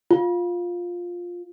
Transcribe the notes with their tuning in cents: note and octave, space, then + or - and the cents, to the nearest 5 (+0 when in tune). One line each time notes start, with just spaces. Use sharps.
F4 +10